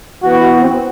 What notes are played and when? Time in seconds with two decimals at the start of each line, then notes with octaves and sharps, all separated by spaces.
0.22 E3 B3 F#4
0.62 C4